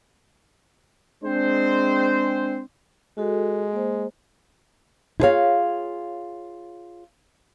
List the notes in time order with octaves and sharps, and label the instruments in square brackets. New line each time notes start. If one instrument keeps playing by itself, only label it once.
[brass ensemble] G#3 C4 D4 C5
[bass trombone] G#3 [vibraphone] F#4 A4
[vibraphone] A#3 C5
[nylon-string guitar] E4 F4 G#4 A4 C#5 F5